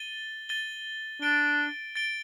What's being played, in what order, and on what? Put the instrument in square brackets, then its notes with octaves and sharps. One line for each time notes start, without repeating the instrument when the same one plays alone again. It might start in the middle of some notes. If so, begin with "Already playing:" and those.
Already playing: [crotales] A6 D#7 G7
A6 D#7 G7
[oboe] D4 [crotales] A6 D7 G7
[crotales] A6 D7 G7